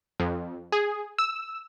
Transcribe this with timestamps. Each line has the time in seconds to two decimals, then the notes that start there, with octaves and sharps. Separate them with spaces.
0.20 F2
0.72 G#4
1.19 E6